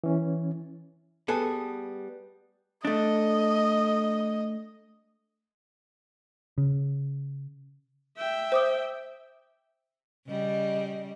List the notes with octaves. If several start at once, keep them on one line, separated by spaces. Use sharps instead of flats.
E3 C#4
G3 B3 G#4 A4
A3 D4 D#5
C#3
E5 G5
C5 D6 D#6
C#3 G3 D#5